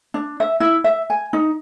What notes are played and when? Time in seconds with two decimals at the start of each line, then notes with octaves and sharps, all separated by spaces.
0.14 D4
0.40 E5
0.60 E4
0.84 E5
1.10 G#5
1.33 D#4